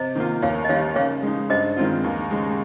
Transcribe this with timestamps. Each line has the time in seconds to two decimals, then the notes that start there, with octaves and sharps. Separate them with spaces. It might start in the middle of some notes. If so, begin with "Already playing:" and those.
Already playing: C3 C5 D#5
0.15 D#3 A#3 F4
0.42 D#2 C#5 F5
0.64 D#5
0.69 D#3 G3 A#3 C#5 F5
0.96 C#3 C#5 F5
1.23 G#3 D#4
1.50 G2 C5 D#5
1.77 D#3 G#3 C4 F4
2.04 D#2
2.31 C#3 G#3